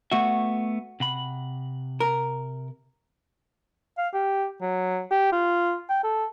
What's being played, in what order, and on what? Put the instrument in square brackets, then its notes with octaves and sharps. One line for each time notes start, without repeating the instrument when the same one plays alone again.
[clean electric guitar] A3 B3 E5 [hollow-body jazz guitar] F#4
[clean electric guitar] C3 F#5 B5
[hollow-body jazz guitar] A#4
[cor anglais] F5
G4
F#3
G4
F4
G5
A4